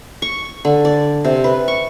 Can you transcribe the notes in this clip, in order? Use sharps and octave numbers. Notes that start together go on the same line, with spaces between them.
C#6
D3
D5
C3
B4
C#6